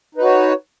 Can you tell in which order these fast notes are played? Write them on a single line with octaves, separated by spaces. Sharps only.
D#4 B4 F#4 C#5